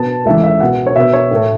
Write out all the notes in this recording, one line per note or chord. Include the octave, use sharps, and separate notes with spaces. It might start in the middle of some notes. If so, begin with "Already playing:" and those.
Already playing: B2 B3 A5
C#2 C#3 E3 A3 E5
E5
B2 B3 F#5
C#5
B2 B3 E5
C#5
A2 A3